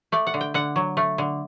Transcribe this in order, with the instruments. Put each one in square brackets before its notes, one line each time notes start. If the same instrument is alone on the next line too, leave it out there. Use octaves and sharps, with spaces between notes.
[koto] A3 D5
F#5
D3
G5
D3 F#5
F#3
A3
D3